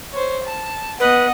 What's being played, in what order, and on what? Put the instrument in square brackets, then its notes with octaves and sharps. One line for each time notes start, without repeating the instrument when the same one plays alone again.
[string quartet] C5 C#5
A5
[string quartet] B3 D#5 F#5 [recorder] B4